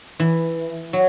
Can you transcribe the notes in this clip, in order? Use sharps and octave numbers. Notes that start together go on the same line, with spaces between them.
E3
F#3